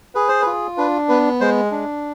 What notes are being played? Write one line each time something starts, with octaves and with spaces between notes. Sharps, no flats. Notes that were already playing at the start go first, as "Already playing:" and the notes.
G#4 B4
C5
F4 B4
D4 B4
B3 B4
G#3 C5
D4